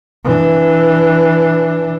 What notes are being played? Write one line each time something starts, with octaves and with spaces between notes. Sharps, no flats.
E3 D4